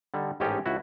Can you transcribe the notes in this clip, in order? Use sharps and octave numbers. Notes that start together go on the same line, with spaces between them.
D3 G3 D#4 A4
A1 G#2 C#4 D#4 G4 A4
C#2 E4 F#4